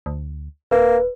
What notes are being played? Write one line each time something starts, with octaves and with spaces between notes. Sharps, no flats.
D2
D#1 A#3 B4